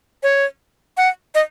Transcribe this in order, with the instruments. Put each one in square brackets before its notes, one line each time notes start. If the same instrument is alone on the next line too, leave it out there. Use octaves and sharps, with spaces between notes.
[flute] C#5
F#5
D#5